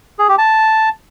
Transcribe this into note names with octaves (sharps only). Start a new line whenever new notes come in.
G#4
G4
A5